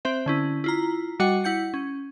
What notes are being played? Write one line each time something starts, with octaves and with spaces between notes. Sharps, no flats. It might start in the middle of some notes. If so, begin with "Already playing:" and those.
C4 C5 E5
D3 C#4 E4
E4 F4 A#5
G3 F#4 D#5 F#5
E4 F#5 G6 C#7
C#4